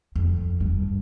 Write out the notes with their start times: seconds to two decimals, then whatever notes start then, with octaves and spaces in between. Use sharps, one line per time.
0.16 F2
0.60 G2